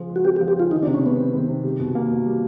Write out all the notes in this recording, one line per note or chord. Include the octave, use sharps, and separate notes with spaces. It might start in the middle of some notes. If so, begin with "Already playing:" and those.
Already playing: C#3 F3
G#3
F#4
C4 G4
G4
F3
G4
C#3 F4
D#3 D#4
D4
C3
C#4
G#3 B3
C4
D#3
C3
G3
B2
A#3
B2
G3